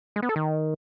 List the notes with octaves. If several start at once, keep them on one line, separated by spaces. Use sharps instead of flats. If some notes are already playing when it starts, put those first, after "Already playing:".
G#3
B3
A4
D#3